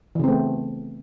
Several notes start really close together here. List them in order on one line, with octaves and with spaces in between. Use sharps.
E3 C#3 C4 A3 B3